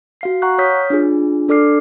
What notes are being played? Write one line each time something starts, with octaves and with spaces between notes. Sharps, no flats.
F#4 F5 C7
F5 F#5 A#5 C#6 F#6
C#5 D#6 F6 G6 B6
D4 F4 G#4
D4 A4 D5 D6 F6 C7